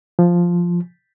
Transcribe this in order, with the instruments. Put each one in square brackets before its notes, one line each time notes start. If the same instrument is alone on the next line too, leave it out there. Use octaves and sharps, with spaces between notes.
[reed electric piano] F3